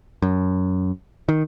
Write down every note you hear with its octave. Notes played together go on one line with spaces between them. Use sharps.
F#2
D#3